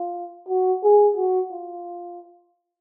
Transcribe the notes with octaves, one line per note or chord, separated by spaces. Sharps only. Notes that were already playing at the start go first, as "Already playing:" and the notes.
Already playing: F4
F#4
G#4
F#4
F4